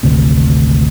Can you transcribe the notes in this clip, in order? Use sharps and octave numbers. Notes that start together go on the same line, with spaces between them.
G#1 D2 C3